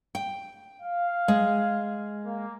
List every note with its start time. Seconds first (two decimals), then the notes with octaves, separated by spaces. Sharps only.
0.15 G5
0.82 F5
1.28 G#3
2.26 A#3